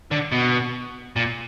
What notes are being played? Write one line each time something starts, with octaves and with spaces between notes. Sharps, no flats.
D3
B2
A#2